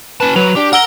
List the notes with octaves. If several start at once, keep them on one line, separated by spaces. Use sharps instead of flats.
C#4 B4 A5
F#3 B4 F7
D4 G4
A#4 F#5 E6 G7